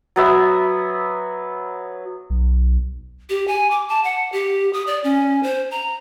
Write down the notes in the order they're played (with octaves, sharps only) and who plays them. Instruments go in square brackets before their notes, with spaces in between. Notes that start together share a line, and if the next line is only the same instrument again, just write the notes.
[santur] F#3 B3 E5
[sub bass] B1
[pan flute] G4
G#5
D6
A5
F#5
G4
D#6
D5
C#4
C5
A#5